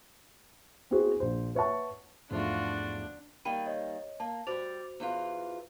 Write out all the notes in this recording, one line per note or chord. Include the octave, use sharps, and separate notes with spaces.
B3 C4 E4 F#4 G#4 C5
A#1 C5
B4 C#5 E5 F#5 A5 C#6
E2 G#2 F3 A3 D4 F4 F#4
D#3 G3 A#3 G5 B5 D#7
C#5 D#5
A#3 A5
G3 F#4 C5 D5 F7
E2 E3 F4